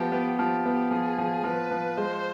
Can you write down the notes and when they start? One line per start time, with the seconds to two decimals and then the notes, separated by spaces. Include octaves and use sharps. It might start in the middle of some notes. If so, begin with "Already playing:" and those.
Already playing: F3 B3 G4
0.12 B3
0.38 F3 G4
0.65 B3
0.91 F3 G#4
1.18 F3
1.44 F3 B4
1.71 F3
1.97 G#3 C5